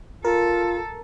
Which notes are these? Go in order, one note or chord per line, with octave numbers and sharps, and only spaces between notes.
F4 A4 A#4